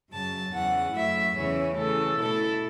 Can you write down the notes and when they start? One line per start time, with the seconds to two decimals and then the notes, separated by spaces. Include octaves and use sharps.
0.11 F#2 C#3 F#3 A5
0.52 E2 C#3 E3 F#5
0.94 F#2 F#3 A3 E4 E5
1.35 E2 C#3 E3 C#4 E4 C#5
1.77 C#3 E3 A3 A4
2.18 B2 A3 E4 A4